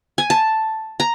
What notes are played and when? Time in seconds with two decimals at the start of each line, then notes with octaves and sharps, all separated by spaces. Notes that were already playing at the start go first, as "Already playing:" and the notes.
0.18 G#5
0.30 A5
1.00 A#5